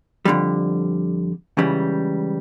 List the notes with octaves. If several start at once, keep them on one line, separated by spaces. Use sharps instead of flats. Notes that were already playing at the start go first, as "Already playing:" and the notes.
F2 D3 G3
C#2 C#3 E3 G3